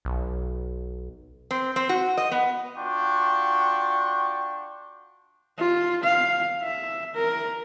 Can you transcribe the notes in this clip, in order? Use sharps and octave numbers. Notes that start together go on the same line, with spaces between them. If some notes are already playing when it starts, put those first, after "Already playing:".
B1
C4
C4
F#4
D#5
B3
D4 F4 F#4 G5 C#6
F4
F5
E5
A#4